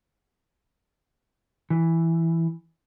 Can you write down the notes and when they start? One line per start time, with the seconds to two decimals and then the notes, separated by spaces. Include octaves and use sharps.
1.70 E3